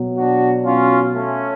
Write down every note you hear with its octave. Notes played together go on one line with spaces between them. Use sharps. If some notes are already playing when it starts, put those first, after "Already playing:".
Already playing: B2 F#3
D4 F#4
C#4 F4
A3 C#4